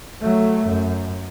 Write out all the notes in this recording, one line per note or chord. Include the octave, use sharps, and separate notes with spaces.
F#3 A3
F#2